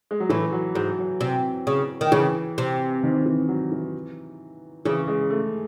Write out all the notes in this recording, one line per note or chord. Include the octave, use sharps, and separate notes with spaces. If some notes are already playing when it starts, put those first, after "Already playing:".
G#3
F#3
A2 E3
F#3
G#2 F#3
F#3
C3
C#3
D#3
C#3 E3
C3
D#3
E3
F#3
E3
C#3 E3
G#3
A3